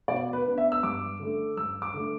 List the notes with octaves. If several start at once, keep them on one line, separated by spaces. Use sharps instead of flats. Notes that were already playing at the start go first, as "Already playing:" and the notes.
B2 D5
B4
B3 D4
E5
E6
G2 D6
D3 A3
G2 E6
D6
D3 A3